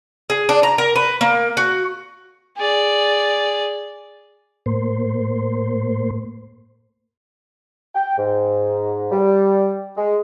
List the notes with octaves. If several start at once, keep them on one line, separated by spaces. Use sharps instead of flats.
G#4
D4
A#5
A#4
B4
A#3
F#4
G#4 D5
A2 A#3 C5
G5
G#2
G3
G#3